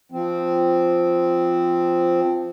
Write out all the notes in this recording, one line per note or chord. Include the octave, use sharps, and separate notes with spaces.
F3 C4